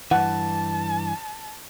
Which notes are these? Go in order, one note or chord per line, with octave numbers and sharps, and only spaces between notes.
G2 E3 F#5 A5